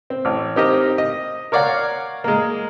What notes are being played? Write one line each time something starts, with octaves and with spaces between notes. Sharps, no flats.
C4
A1
C4 D#4 G4 A#4 D#5
D#5
A#4 C#5 D5 F5 F#5
G#3 A#3